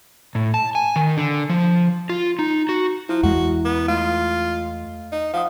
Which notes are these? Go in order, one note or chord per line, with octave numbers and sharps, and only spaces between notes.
A2
A5
G#5
D#3
D3
F3
F4
D#4
F#4
F3 E4
E2 G#3 F#4
B3
A3 F4 F5
D#4
F3 F5 F#5 D#6